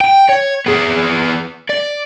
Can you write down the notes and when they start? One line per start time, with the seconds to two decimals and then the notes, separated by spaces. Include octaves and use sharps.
0.01 G5
0.29 C#5
0.67 B3 G#4
1.70 D5